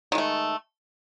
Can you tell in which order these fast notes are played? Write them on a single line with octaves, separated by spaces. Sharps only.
D#3 G#3 A3